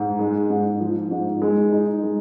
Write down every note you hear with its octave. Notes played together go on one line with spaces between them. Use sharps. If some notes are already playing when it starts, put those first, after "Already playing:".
Already playing: G#2
G#3
G#2
F3
G#2
G#3
D#4
G#3